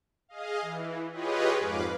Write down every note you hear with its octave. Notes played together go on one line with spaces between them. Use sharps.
G#4 D#5 F5
E3
F4 G4 G#4 B4 C#5 D#5
F2 G#2 B4 F5 D6